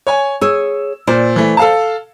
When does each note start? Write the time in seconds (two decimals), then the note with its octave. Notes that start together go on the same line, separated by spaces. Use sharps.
0.07 C#5 G#5
0.41 G#4 C#5 E6
1.07 A#2 C5 D5
1.36 E3 A3
1.57 A4 F5 A5